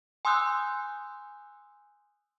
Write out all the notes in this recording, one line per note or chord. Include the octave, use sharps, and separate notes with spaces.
G#5 C6 D#6 E6 F#6 G6